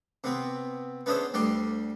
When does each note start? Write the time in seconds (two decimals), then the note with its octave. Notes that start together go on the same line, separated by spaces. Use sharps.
0.24 C3 B3 C4
1.06 B3 C#4 D4 E4 G#4 C5
1.34 D2 G3 G4 C6